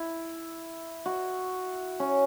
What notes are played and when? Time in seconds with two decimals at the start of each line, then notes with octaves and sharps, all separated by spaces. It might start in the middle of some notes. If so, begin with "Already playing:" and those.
Already playing: E4
1.06 F#4
2.00 C#4